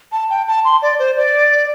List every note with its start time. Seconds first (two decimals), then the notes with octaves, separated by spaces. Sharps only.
0.12 A5
0.30 G5
0.48 A5
0.65 C6
0.82 D5
0.99 C5
1.17 D5